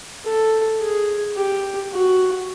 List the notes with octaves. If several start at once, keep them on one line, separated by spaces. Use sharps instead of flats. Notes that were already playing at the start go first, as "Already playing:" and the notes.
A4
G#4
G4
F#4